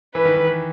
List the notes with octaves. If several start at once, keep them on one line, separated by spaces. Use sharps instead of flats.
E3 B4
D#3
D#3
E3